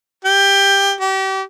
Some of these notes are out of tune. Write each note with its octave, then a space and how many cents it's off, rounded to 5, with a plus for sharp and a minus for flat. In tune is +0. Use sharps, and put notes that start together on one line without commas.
G4 +15
G4 -35